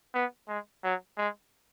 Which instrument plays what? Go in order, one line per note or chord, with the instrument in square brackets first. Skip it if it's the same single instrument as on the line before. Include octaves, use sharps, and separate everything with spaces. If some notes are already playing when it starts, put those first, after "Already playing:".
[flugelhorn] B3
G#3
F#3
G#3